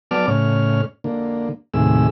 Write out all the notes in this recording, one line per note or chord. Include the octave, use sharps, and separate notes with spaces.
F#3 B3 D5 A5 D6 F6
A2 C#3 C#5 F6
D3 A#3
D#2 A2 C3 G#4 E6